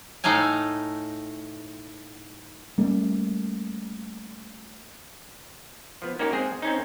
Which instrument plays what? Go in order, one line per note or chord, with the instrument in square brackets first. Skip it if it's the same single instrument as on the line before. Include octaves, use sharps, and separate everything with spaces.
[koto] A2 A3 D#4 F5 G#5
[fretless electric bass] G3 A3 A#3 C#4
[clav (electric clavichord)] F3 B3
A#3 C#4 D#4 F#4 G4
G#3 C4 G#4
C4 C#4 D#4